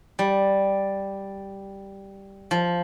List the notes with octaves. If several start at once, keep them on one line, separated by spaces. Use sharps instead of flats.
G3
F3